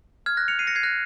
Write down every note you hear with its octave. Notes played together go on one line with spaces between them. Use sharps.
F6 G#6
F#6 A#6
C#7 F7
C7 D#7
A#6 C#7
G#6 C7
F#6 A#6